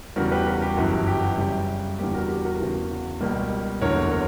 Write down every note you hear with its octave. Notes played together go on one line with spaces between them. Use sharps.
E2 C#3 G3 F#4 A#4
G4 B4
F#4 A#4
G4
G1 F#2 E3 F#4
G4
F#2 C#3 G3
E2 D3 G3 A#3 G4
F#4 A#4
G4
F#4 A#4
E2 C#3 E3
C#2 B2 G3 A#3
F#1 E2 D3 F#3 A#4 C#5
A#4 C#5